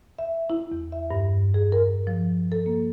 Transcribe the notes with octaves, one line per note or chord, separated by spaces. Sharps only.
E5
E4
E2
E5
G2
G#4
A#4
F3
A4
A#3